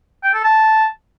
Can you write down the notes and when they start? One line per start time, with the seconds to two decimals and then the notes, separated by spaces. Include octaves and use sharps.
0.23 G5
0.34 A4
0.44 A5